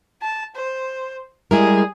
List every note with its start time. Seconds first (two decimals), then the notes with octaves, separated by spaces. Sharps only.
0.22 A5
0.55 C5
1.51 G3 G#3 E4 G#4 A#4